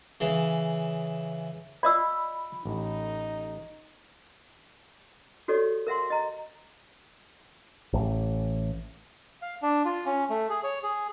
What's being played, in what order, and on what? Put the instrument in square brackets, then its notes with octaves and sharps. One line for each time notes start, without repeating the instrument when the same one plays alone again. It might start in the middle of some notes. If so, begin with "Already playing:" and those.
[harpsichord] C#3 E3
[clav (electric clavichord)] F4 [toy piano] D5 D#5 E6 [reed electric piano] B5
[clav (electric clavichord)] A1 [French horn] D#4
[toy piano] F#4 G4 A4 C#5 D5
A#4 E5 F#5 C6
D#5 A#5
[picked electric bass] A1
[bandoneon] F5
D4
F4
C#4
A3
G#4
C#5
G#4